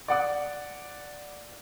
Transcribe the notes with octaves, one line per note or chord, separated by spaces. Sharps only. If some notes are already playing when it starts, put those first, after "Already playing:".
D5 F#5 D6